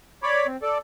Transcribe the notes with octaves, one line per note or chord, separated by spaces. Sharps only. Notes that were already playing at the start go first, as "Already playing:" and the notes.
C#5 D5 B5
C4
A4 D5